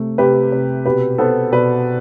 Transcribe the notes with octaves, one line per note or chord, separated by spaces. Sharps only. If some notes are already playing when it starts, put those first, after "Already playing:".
Already playing: C3 A3
C3 G4 B4
C3
B2 G4 B4
B3 A4 C5
B2 B4 D5